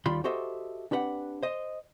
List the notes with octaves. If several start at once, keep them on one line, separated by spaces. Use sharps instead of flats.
D#2 D#3 G3 F4 B5 C6
F#4 G4 A4 C5 D#5 E5
C4 D4 G4 B4 F#5
C5 D#5